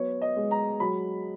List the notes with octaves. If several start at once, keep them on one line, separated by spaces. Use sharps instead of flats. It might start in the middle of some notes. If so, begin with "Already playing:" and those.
Already playing: F#3 B3 C#5
D#5
G#3
A#5
F#3 B5